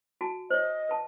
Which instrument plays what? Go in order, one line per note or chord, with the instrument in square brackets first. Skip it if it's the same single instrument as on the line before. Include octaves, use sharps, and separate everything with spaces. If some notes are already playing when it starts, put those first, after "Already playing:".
[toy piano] F#4 G#5 A5
[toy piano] C5 C#5 [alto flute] D#5
[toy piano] B4 A5